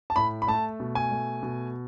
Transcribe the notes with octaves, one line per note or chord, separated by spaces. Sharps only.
A5
A2 B5
B5
A3 A5
B2
G#5
A3
B2